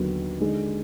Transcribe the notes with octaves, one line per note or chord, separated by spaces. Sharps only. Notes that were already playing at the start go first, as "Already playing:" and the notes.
Already playing: D#2 D3 F#3 B3
D3 G#3 D#4